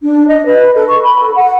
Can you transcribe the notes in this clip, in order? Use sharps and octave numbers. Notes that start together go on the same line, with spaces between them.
D4
D#5
B4
A4
C#6
B5
A4
F#5